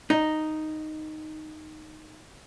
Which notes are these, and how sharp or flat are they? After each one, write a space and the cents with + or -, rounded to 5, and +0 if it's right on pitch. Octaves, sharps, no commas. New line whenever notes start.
D#4 -5